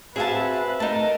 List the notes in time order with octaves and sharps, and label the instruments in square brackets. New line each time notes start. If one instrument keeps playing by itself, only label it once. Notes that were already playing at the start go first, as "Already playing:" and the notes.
[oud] C4 F#4 F5 [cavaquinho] G#4 E5 A5 [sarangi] B4
[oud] A3 [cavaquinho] D#4 A5 [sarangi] A#4